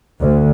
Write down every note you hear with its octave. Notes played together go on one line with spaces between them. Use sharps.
D2